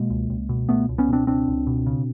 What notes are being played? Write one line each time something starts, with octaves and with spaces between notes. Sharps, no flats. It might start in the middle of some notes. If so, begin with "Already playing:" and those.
Already playing: B2 G#3 A#3
C#2
C#2
B2
C#2 A3 B3
C#2
B3 C#4
B2 C4 D4
C#2 C4 D4
C#2
B2
C#3